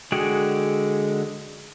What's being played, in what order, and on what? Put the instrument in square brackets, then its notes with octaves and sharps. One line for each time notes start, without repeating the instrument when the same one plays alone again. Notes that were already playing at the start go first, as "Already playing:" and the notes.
[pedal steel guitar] D3 G#3 F#4 G#4 G5